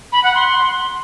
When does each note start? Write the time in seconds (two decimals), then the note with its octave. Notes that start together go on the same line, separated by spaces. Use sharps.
0.12 B5
0.23 F#5
0.35 C6